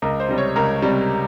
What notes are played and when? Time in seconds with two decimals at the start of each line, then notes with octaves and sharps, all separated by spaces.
0.02 C#2 A#4
0.20 C5
0.29 C3 G3
0.38 C#5
0.56 C#2 A#4
0.82 C3 G3